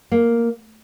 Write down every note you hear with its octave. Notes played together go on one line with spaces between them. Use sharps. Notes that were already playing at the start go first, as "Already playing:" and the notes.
A#3